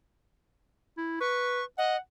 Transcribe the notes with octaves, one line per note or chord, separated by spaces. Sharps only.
E4
B4 C#6
D#5 F#5